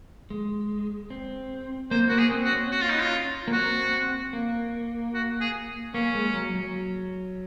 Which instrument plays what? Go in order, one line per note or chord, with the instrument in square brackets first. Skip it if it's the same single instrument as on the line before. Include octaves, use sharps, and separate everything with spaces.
[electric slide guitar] G#3
C4
[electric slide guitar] A#3 [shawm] C5
[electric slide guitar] A#3 [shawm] F#4
[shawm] G#4
[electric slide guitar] C4
[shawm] F#4
[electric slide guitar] C#4
[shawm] F#4
F4
D#4
F4
[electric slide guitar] A#3
[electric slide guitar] C4 [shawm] F#4
[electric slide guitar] A#3
[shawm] F#4
G#4
[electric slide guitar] A#3 [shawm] C#4
[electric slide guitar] G#3
F#3
F#3